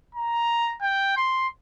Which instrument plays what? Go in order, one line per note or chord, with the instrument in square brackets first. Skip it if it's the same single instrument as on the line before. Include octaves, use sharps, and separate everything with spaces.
[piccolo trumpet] A#5
G5
C6